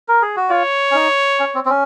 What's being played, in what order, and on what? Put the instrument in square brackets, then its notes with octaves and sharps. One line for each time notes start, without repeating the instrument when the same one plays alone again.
[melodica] A#4
G#4
F#4
[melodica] F4 [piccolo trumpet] C#5
[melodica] C#4
D#4
C#4
C4
C4
C#4